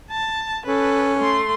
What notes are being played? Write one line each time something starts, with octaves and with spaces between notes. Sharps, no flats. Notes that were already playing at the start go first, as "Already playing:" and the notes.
A5
C#4 A4 B4
A3 C6